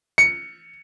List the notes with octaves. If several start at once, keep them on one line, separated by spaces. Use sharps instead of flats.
C#7